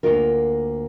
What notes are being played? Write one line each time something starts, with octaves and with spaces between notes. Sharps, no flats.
D2 A#2 A#3 D4 F4 A#4